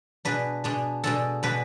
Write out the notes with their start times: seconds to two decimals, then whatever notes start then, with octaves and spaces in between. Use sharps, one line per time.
0.25 B2 G#3 D4 B4
0.64 B2 G#3 D4
1.04 B2 G#3 D4 A4
1.43 B2 G#3 D4 B4